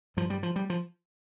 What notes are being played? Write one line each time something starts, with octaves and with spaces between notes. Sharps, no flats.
G2 F3
G3
F3
G3
F3